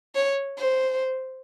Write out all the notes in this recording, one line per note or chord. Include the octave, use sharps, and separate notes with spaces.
C#5
C5